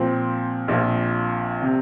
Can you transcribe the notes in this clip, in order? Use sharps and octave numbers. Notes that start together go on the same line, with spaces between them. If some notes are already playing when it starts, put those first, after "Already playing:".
Already playing: A#2 F3 C4
A#1 A#2 F3
C3